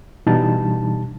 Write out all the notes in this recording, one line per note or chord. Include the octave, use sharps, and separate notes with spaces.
B2 E3 G3 D4 D#4 A5